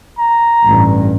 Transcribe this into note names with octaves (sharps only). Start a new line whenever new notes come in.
A#5
A1 G2